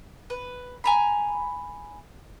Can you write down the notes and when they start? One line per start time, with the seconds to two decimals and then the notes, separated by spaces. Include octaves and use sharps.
0.30 B4
0.84 G#5 A#5 B5